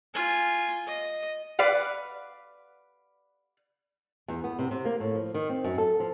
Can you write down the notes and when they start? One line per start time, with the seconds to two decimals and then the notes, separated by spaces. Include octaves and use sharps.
0.14 F4 G#5
0.87 D#5
1.59 B4 D5 F5 F#5
4.28 E2
4.44 B3
4.59 C3
4.71 C3
4.85 A#3
5.00 A2
5.15 F3
5.34 D#3
5.49 C4
5.64 F#2
5.78 A4
6.00 F3